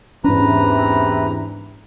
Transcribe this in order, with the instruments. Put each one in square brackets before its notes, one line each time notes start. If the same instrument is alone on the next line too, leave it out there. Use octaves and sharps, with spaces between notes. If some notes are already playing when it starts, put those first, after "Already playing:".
[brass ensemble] E2 C3 E3 [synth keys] G#2 D4 [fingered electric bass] C#4 [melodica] B4 A#5